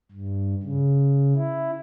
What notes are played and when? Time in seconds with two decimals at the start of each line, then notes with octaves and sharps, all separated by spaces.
0.12 G2
0.63 C#3
1.36 E4